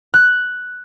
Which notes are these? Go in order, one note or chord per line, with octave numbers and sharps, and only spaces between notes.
F#6